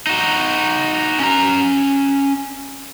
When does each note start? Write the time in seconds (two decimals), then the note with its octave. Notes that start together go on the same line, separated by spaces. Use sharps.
0.07 D#4 F#4
1.20 C#4 A#5